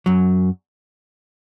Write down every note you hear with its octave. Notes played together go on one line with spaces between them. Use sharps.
F#2 F#3